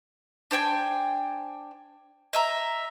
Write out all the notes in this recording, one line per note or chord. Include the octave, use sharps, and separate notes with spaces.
D4 C5 G5 G#5
D#5 E5 A#5